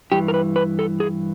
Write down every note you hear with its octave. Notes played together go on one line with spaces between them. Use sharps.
G2 E3 G4
A#4
B4
B4
A4
G#4